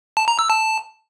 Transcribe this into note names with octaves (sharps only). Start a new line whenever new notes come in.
A5
A#5
E6
A5